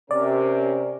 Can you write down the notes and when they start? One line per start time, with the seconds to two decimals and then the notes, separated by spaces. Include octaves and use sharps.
0.11 C3 C#4 A#4 D5